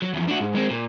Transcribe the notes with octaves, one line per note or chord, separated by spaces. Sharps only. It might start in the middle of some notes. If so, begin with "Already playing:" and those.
F#3
E2 F3
D4 F#4
G#2
G#3 C4
A#2